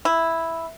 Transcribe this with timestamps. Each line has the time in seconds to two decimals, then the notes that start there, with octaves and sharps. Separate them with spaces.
0.05 E4